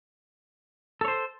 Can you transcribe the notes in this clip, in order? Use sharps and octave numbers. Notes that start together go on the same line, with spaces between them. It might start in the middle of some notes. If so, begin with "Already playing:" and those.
A4 C5 C#5